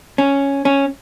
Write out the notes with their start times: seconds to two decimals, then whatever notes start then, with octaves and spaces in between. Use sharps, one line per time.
0.18 C#4
0.65 C#4